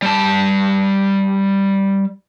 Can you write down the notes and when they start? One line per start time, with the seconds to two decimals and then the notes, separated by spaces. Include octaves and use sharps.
0.02 G3 A5